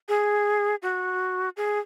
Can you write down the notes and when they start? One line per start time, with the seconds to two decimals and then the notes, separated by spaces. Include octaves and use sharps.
0.08 G#4
0.82 F#4
1.57 G#4